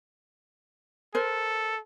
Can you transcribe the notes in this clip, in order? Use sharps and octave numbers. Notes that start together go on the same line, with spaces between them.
A4 A#4 C5